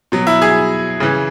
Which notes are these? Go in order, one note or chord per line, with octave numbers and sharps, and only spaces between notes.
B2 F#3
E4
G#4
C#3 E3